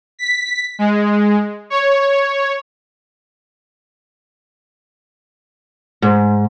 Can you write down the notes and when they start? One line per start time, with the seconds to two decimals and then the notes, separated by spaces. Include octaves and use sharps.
0.19 B6
0.79 G#3
1.70 C#5
6.02 G#2